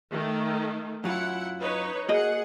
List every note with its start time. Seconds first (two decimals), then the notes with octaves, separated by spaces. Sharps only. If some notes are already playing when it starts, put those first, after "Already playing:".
0.11 D#3 A3
1.04 F#2 F#3 E4 F4 F#5
1.60 D#4 B4 C#5
2.09 A#3 F#4 G#4 D#5 F#5